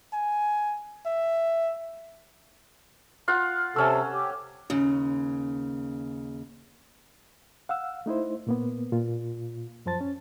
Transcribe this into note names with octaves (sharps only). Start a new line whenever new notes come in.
G#5
E5
F4 F5 F#5
C3 C#4 A4 E6
G4
D#2 C#3
F5 F#5 E6
A3 D#4 E4 C5
A#2 A#3 B3
A#2 F4
F#2 F3 C5 A5 A6
C#4